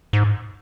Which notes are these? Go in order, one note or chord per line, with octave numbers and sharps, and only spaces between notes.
G#2